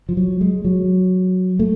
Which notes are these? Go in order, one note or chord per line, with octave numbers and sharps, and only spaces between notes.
F3
F#3
G#3
F#3
A3